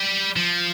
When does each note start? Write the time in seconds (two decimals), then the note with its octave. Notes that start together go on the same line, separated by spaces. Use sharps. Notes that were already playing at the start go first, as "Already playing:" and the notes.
Already playing: G3
0.36 F3